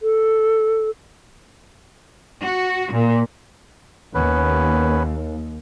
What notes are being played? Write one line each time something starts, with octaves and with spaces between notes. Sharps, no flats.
A4
F#4
A#2
D#2 B3 C#4 B4